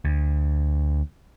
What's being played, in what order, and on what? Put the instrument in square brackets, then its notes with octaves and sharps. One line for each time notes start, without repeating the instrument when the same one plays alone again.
[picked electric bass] D2